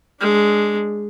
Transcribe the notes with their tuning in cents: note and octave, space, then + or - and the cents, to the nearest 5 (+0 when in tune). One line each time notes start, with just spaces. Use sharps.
G#3 +0 D4 -5